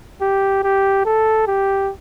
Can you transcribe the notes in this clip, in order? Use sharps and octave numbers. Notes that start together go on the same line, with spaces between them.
G4
G4
A4
G4